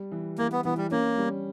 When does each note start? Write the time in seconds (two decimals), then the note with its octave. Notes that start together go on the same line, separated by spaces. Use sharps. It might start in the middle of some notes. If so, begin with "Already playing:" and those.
Already playing: G3
0.12 E3
0.38 E3 A#3
0.52 B3
0.65 E3 B3
0.77 G3
0.91 A#3 C#4
1.18 G3